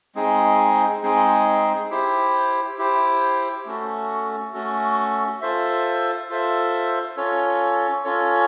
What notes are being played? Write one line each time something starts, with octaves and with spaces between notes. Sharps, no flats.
G#3 C4 D#4 G#4
G#3 C4 D#4 G#4
E4 G4 C5
E4 G4 C5
A3 C#4 F#4 A4
A3 C#4 F#4 A4
F4 A4 C5 E5
F4 A4 C5 E5
C#4 F4 A4 C#5
C#4 F4 A4 C#5